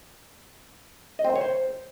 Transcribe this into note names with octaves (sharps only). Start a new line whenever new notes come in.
D#5
C4
C5
C#5
C5